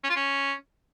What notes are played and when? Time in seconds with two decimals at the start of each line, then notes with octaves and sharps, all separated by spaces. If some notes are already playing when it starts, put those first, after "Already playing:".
0.04 C#4
0.10 F4
0.16 C#4